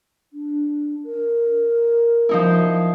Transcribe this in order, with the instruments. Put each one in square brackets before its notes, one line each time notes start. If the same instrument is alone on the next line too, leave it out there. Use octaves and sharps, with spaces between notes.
[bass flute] D4
A#4
[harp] F3 D#4 E4